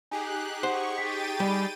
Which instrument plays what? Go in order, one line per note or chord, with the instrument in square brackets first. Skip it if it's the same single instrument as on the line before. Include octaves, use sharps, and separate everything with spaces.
[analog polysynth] D#4 G4 G#4 [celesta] G#5 [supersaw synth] F#6
[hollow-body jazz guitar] C5 [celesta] F#5 [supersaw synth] C#6
[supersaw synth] G5 A6 D#7 [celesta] B6
[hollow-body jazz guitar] G3 [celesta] G#5 B5